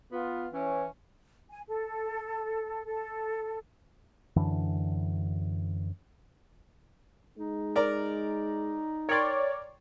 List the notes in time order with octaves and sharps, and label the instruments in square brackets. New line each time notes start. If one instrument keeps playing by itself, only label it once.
[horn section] B3 F4
E3 C#4
[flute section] G#5
A4
A4
[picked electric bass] F#2 D3 E3 D4
[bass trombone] G#3 [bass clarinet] D#4
[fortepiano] A#4 D5 A#5
[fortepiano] A#4 G5 C6 [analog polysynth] C#5 D5